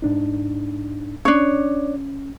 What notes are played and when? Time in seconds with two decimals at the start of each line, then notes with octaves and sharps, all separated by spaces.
0.02 G#2 D4 D#4
1.25 C#4 D4 C#5